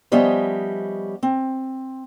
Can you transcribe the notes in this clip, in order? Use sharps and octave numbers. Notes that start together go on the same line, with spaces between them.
F3 G3 B3 C#4 D#5 E5
C4